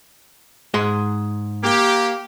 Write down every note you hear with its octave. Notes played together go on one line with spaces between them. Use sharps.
G#2 G#4 C6
A#3 G4